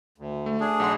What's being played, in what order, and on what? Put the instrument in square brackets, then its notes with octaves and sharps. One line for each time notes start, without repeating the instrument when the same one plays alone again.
[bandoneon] D2
[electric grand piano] A3
[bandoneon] D4 G#4
[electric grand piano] B1 F#5 C6